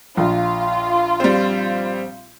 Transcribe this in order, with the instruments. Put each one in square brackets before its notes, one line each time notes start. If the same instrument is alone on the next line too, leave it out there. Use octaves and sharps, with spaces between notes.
[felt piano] A#1 [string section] F4
[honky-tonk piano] G3 C4